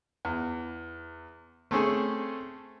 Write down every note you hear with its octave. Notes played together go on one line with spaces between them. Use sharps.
E2
A3 C4 C#4 G#4 A4